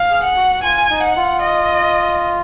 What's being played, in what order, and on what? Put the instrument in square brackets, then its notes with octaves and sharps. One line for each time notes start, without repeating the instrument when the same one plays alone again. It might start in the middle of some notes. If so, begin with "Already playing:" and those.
Already playing: [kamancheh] F5
[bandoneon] G#4
[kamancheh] F#5
[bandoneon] F#4
[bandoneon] F4 [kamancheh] G#5
[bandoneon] D#4
[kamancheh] F#5
[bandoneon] F4
[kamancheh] D#5